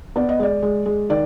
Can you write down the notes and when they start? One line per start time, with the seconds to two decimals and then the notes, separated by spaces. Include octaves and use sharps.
0.16 B3 D5
0.29 D#5
0.39 G#3 D5
0.62 G#3
0.86 G#3
1.09 D#3 D5